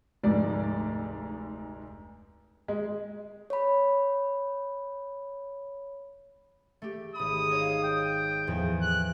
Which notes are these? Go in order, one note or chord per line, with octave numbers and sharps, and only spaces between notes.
F1 D2 G#2 D5
G#3
C#5 B5
A3 G4
G#1 B5 D#6
D#4 C#5 F5
G5
E2 A2 F3
F#6